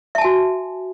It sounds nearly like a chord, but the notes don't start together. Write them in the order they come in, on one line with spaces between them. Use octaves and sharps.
E5 A5 G#5 F#4